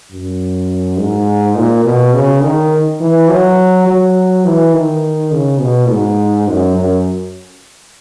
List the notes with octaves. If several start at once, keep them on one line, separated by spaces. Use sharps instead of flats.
F#2
G#2
A#2
B2
C#3
D#3
E3
F#3
F#3
E3
D#3
C#3
B2
G#2
F#2
F#2